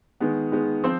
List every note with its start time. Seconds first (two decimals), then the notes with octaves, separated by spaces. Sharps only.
0.20 D#3 G#3 B3
0.52 D#3 G#3 B3
0.83 F3 C4 C5